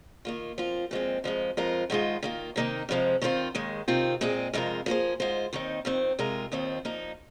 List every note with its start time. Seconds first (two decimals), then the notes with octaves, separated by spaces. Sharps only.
0.25 D#3 A#3 F4
0.58 F3 C4 F4
0.91 A#2 F3 G#3 C4
1.24 F2 F3 G#3
1.57 F2 F3 G#3 F4 A#4
1.90 G#2 D#3 G#3 F4
2.23 D#3 A#3 F4
2.56 C3 D#3 A#3 D#4 A#4
2.89 F2 C3 F3 G#3
3.21 D#3 C4 F4 C5
3.55 D#2 D#3 G#3
3.88 C3 D#3 C4 F4
4.21 A#2 G#3 C4 G#4
4.53 F2 C3 G#3 F4 A#4
4.86 F3 A#3 G#4 C5
5.20 G#2 G#3 F4 C5
5.53 D#2 D#3 C4 D#4
5.85 F2 D#3 C4
6.19 C3 G#3 F4 A#4
6.52 D#2 D#3 C4 F4
6.85 F3 A#3 D#4 A#4